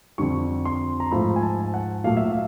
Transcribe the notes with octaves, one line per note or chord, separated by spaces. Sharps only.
F2 D3 G3 C#6
C6
A#5
G#2 F3 A3 B5
G#5
A5
F#5
A#2 F#3 A3 F5
E5
F5